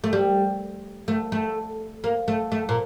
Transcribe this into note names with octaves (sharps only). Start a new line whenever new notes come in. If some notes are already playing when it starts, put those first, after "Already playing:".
A3
G3
A3
A3
A#3
A3
A3
A#2